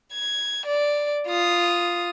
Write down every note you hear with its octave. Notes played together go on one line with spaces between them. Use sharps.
G#6
D5
F4 D#6